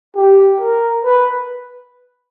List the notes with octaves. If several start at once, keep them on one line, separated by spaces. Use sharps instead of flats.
G4
A#4
B4